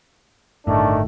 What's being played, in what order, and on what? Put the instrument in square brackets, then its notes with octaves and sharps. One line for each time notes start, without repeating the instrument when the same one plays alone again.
[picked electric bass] G1 A2 [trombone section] D#3 A3 D4